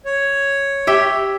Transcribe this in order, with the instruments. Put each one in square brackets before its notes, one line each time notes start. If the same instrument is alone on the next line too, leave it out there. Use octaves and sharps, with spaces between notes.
[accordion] C#5
[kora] G4 E5 G5